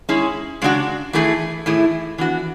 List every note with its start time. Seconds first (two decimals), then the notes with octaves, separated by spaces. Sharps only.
0.09 G#3 C#4 E4 G#4
0.62 C#3 G#3 D4 F#4
1.13 E3 A3 E4 G#4
1.66 A2 E3 A3 E4 G#4
2.18 E3 B3 D4 F#4